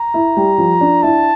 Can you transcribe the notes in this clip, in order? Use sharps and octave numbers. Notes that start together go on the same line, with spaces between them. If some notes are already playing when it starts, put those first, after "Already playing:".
Already playing: A#5
E4
G3
F3
D4
E4 A5